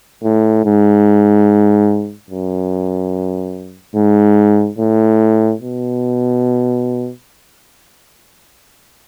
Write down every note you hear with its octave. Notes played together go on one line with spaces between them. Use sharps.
A2
G#2
F#2
G#2
A2
B2